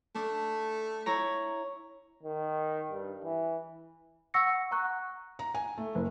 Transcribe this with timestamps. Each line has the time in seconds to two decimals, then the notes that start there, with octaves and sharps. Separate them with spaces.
0.15 A3 D4
1.06 E4 C#5 A#5
2.23 D#3
2.91 G2
3.24 E3
4.34 F#5 C#6 E6 A#6 C#7
4.71 F#5 A#5 C#6 F#6
5.39 A#5
5.55 G#5
5.78 A3
5.95 F#1